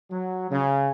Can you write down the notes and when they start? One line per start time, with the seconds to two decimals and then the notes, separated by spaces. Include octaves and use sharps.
0.10 F#3
0.51 C#3